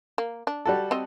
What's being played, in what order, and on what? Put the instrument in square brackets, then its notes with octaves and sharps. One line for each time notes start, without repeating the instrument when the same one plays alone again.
[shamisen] A#3
D4
[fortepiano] G3 F#4 A4
[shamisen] C4 D#5